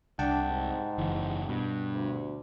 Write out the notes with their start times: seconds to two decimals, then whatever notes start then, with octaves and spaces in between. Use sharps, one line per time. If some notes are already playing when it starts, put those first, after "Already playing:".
0.19 C2 D4 F#5 G5 A5
0.48 G#2
0.98 F#1 E3
1.49 G2 B2
1.92 D2